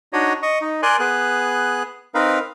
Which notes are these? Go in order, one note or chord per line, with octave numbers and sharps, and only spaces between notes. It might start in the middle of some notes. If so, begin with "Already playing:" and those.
D4 D#4 F#4 C#5 D#5
D#5 C#6
D#4
A#4 D5 G#5 C6 F#6
B3 G#4 F#6
C4 D#4 A#4 B4 F5